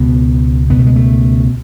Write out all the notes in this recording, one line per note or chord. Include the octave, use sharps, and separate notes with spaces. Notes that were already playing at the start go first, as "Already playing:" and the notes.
Already playing: C#2 B2 B3
C#2 B2 B3
A3
G#3
A3